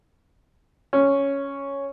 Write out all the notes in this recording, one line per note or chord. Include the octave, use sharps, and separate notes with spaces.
C#4